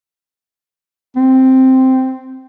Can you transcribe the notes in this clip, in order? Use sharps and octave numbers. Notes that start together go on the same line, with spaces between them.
C4